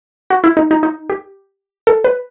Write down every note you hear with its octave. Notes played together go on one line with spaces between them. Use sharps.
F#4
E4
D#4
D#4
D#4
G4
A4
B4